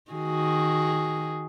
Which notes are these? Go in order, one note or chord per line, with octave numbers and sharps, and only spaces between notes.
D#3 F#4 G#4